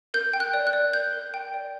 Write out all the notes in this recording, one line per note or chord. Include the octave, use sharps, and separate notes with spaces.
A#4 G6
G5
F#6
D5
F#6
D5
A#4 G6
A#4
G5
D5